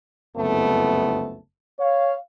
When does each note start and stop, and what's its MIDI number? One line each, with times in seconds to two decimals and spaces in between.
0.36 1.37 30
0.36 1.37 36
0.36 1.37 41
0.36 1.37 57
0.36 1.37 59
0.36 1.37 81
1.79 2.15 73
1.79 2.15 77